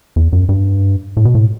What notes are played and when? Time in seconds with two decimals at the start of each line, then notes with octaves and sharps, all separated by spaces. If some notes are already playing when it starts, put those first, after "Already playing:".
0.16 E2
0.33 F#2
0.49 G2
1.17 A2
1.25 B2
1.35 A2